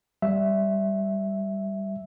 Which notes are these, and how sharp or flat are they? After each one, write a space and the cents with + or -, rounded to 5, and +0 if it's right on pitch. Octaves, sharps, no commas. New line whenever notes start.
G3 +0 E5 +0